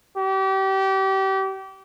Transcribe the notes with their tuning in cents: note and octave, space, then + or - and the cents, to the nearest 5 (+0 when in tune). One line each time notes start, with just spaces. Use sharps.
G4 -30